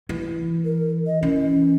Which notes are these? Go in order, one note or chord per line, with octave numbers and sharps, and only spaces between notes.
E3
A#4
D#5
E3 C#4